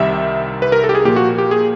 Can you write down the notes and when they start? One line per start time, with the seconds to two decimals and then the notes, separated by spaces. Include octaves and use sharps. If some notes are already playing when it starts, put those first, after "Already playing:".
Already playing: C2 C3 D#3 G3 E5
0.62 B4
0.72 A#4
0.84 A4
0.89 G4
0.95 G#4
1.05 A#2 F3 A#3 G4
1.16 F#4
1.38 G4
1.51 G#4